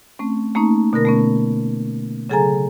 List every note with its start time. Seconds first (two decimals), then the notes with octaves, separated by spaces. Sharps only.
0.19 A3 C4 C#4
0.55 A3 A#3 C#4 D#4
0.93 B2 D3 B3 A#4 A#6
1.05 A3 B3 C#4
2.30 C#3 F#3 G#4 A4 G#5 A#5